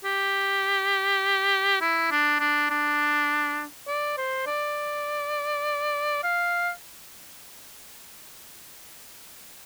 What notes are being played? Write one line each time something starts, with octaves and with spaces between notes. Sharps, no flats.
G4
E4
D4
D4
D4
D5
C5
D5
F5